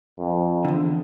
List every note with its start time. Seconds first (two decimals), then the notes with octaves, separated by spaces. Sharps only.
0.19 F2
0.65 E2 D3